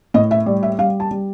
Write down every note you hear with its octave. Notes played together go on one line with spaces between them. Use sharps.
A2 D#5
E5
G3 D5
E5
G3 F5
A5
G3